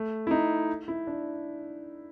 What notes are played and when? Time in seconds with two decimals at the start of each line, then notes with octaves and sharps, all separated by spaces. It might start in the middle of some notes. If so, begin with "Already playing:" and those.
Already playing: A3
0.27 E4
0.31 D#4
0.88 E4
1.07 D4